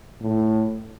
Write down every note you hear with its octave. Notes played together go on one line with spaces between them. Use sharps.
A2